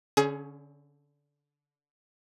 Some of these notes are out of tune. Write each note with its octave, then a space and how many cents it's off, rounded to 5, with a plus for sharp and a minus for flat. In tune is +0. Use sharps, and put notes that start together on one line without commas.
D3 -20 C#4 +0 G#4 +25